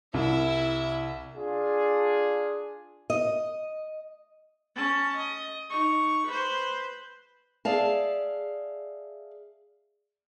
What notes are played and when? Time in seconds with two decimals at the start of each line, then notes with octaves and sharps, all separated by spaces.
0.14 C2 E4 E5
1.36 D4 F4 G#4
3.10 D#5
4.75 C#4 A5
5.16 D#5
5.70 D#4 C#6
6.27 B4 C5
7.65 G#4 D5 E5 F5 A5